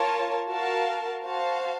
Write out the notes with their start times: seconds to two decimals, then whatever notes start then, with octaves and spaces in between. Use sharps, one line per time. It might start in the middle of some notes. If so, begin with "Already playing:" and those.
Already playing: F4 A#4 C#5 A5
0.48 F#4 A#4 F5 A5
1.24 F#4 C5 F5 A5